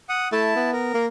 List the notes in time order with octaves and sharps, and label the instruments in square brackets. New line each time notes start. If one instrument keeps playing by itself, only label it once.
[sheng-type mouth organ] F#5 D#6
[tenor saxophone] A3 [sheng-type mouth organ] E4 A5
[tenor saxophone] B3
[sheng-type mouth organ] A#4
[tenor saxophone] A#3